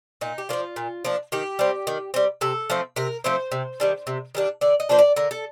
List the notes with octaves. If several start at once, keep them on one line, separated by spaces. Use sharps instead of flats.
A#2 D#4
G4
F3 A#3 D4 F4
A#2
F3 A#3 D4
D#3 G4
G3 C4
D#3
G3 C4
C3 A4
F3 A3 C4
C3 A#4
F3 A3 C4 C5
C3
D#3 G3 D4
C3
D#3 G3 D4
D3 D5
D#5
F3 A#3 D4 C5
D5
D3 A#4
A4